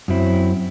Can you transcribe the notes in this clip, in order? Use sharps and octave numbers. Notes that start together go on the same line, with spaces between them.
F#2 F#3 C4 E4